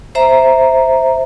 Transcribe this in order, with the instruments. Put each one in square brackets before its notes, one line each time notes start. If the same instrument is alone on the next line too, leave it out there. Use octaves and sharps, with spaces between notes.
[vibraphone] C5 E5 A#5